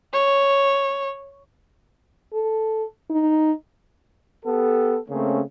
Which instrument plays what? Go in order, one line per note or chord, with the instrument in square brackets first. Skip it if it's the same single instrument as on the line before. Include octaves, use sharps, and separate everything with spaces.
[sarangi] C#5
[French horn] A4
D#4
[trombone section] B3 G4 A4
C#3 A3 A#3 C4 C#4